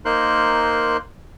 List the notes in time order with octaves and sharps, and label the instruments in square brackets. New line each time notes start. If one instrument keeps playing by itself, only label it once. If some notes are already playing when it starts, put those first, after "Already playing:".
[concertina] A#3 D#4 A#4 C5 C6 F#6